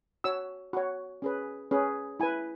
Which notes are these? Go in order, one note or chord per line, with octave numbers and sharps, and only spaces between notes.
F#4 C#5 E6
F#4 C#5
C#4 G#4 B4
C#4 G#4 B4
E4 B4 G#5